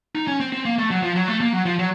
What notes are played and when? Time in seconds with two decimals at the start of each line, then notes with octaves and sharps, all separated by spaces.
0.15 D#4
0.27 C#4
0.40 C4
0.52 C4
0.65 A#3
0.78 A3
0.91 F#3
1.03 F3
1.16 F#3
1.28 A3
1.41 A#3
1.53 F#3
1.65 F3
1.79 F#3